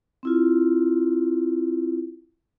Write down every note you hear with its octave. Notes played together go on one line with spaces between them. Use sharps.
C4 E4 F4